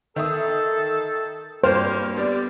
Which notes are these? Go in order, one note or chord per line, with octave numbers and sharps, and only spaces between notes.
D#3 A4 E5 D#6
G2 B2 A#3 C5 F6 E7
D3 G3 B3 D4